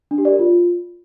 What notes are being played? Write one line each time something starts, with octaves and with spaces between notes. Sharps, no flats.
D4
G4
D5
A#4
F4